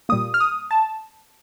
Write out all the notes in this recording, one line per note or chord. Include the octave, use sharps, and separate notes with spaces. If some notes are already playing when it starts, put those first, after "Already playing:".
A#2 G3 A#3 D#6
F6
D#6
A5